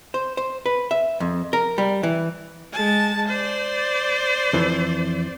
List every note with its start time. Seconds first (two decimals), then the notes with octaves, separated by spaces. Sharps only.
0.14 C5
0.37 C5
0.66 B4
0.91 E5
1.20 F2
1.53 A#4
1.78 G3
2.03 E3
2.73 G#3 A5
3.28 C5 D5
4.53 F2 E3